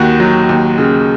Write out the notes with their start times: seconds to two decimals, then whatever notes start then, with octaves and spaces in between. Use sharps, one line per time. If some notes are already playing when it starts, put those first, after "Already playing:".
Already playing: D#2 D#3 F#4
0.20 F#3
0.49 D#2
0.78 C#3